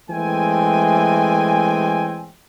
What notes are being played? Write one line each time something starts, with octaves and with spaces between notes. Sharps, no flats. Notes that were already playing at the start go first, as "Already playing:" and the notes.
E3 G#3 A3 C4 G5 G#5